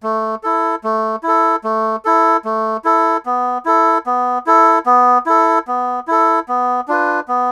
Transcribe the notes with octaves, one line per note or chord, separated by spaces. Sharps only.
A3
E4 A4
A3
E4 A4
A3
E4 A4
A3
E4 A4
B3
E4 A4
B3
E4 A4
B3
E4 A4
B3
E4 A4
B3
D4 F4 B4
B3